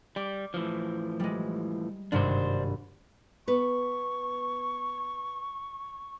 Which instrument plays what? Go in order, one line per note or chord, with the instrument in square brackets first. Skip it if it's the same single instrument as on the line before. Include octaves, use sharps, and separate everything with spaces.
[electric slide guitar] G3 [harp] D6
[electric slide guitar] A2 E3 F3
[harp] G3 G#3
[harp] G#1 G2 C3 [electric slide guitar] D4 C5
[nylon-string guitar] B3 B4 [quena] C#6